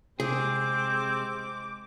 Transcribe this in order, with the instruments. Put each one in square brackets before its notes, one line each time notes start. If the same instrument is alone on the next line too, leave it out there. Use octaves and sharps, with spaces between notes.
[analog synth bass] C3 [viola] G#3 D6 [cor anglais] C4 [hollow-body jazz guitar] G#4